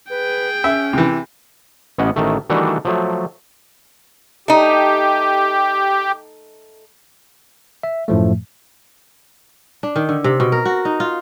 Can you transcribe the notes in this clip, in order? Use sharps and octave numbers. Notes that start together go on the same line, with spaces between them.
G#4 B4 G5
C#4 E5
C3 E3
A1 B3 C#4 D#5 F#5
A1 D#3 A3
D#3 E3 G3 A3 D4 F#4
F3 F#3 A3
A3 D#4 G4
E5
F#2 A2 F3 A3
D4
D#3
D3
C3
B2
A#4
F#4
D#4
F4